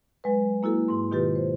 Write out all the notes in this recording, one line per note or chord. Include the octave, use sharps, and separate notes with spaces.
F#3 G#3 B4
A#3 E4 F#4 A4
G#2 C6
B2 D#3 F4 G4 B4 A6
C5